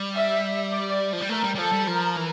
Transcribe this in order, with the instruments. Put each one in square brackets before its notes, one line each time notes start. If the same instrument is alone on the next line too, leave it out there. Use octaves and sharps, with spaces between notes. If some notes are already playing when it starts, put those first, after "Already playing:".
Already playing: [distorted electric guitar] G3
[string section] E5
D5
[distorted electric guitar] F3
G3
[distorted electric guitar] A3 [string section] A#4
[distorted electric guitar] G3
G3
[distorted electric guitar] F3 [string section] A4
[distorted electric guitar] G3
[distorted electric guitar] F3 [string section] A#4
[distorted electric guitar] E3